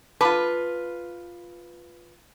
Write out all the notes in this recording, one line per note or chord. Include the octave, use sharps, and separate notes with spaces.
F4 B4 A5 D6